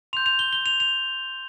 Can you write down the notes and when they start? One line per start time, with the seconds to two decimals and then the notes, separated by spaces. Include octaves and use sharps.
0.13 C6 G6 F7
0.26 F7
0.39 G7
0.53 G7
0.66 F7
0.80 F7